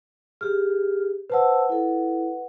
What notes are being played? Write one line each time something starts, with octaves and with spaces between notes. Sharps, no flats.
G4 G#4 F6
B4 C5 F#5 A5 E6
E4 A4